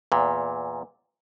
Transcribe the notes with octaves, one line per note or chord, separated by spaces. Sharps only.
E2 A#2